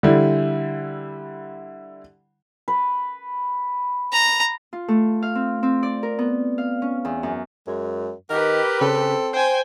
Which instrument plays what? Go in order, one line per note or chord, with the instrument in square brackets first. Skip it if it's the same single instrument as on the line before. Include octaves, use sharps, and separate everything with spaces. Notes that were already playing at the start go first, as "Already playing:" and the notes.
[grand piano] D3 G3 E4
[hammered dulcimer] B4
[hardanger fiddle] A#5
[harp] F4
A3
F5
C4
C4
D5
A#4
B3
F5
C#4
E2
F#2
[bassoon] F#2 [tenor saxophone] G#3
[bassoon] D#3 [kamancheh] G4 B4 [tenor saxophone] A#4
[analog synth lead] C#3 [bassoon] C4 [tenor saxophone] A4
[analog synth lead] C5 [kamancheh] G5 G#5